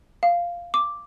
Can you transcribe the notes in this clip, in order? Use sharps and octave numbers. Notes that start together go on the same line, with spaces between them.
F5
D6